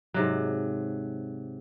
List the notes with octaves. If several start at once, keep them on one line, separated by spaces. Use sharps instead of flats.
G#2 C3 F#3